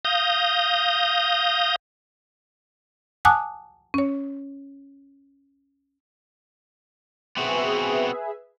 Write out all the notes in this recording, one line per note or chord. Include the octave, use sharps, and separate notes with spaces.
F5 D#6 G6 A#6
F#5 G#5 A5 D6 D#6 F#6
C#4 C#5
B3 C4 F#4 G#4 B4 E5